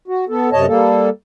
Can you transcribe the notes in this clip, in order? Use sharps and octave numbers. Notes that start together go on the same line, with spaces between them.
F#4
B3 A4
F#2 C3 C#5 D#5 A5
G3 A#3 A4